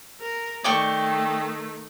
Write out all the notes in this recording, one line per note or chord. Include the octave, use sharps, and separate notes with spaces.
A#4
D#3 A3 D5 G5 C#6